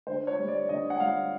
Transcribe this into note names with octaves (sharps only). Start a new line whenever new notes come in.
D3 C5
C#5
G3
D5
D3 D#5
F#5
G3 F5